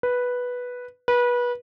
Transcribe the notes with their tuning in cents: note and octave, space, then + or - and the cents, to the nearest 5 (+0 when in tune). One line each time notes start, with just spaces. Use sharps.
B4 -5
B4 -25